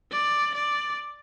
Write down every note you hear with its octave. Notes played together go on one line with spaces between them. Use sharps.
D5
D5